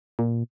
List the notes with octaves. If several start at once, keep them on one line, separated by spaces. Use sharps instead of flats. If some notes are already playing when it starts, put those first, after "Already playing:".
A#2